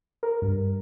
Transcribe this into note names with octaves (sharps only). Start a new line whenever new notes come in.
A#4
G2